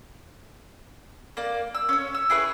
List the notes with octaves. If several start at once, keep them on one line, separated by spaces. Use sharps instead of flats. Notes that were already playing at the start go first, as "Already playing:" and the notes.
A#3 D5
E6
C#4 C#5
E6
E4 G#4 B4 C#6